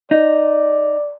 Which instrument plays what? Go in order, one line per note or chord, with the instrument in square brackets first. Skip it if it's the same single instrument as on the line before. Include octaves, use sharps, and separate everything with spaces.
[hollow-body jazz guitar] D#4 [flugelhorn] D5